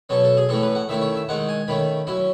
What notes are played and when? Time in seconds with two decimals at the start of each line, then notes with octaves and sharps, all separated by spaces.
0.09 B2 F#3 C#4 A4
0.24 A4
0.37 G#4
0.49 A2 E3 A3 C#4 A4
0.63 B4
0.75 F#5
0.89 D#3 A3 C#4 E4 E5
1.02 C#5
1.16 E5
1.29 D#3 G#3 D#4 F#5
1.49 G#5
1.68 D#3 A3 C#4 B5
2.07 F#3 C#4 E4